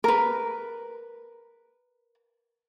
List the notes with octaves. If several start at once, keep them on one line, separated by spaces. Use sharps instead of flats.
A#4 B4